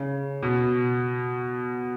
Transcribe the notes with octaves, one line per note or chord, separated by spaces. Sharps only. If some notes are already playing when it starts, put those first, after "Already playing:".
Already playing: C#3
B2